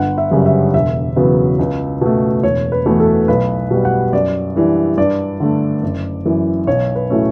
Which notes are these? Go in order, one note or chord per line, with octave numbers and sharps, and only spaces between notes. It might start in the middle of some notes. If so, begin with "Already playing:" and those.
Already playing: G1 F#5
E5
F#2 C#3 G3
E5
E1 E5
E2 C#3 F#3 B3
C#2
B2 A3
E1 C#5
B4
E2 B2 A3
A4
B1 B4
B2 G3
F#5
F#2 D5
E3 G3 D4
G2 D5
D3 A3
F#1
F#2 E3
B1 C#5
B4
A2 F#3 A3 C#4